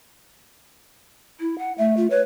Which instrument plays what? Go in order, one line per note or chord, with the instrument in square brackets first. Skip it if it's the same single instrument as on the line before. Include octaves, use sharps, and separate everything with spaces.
[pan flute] E4
F#5
[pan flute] A3 [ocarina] E5
[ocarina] F4
[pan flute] B4 [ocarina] C#5